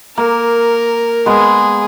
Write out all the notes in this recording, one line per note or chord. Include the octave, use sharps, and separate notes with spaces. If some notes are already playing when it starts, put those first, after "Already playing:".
A#3 A#4
G#3 B3 G#4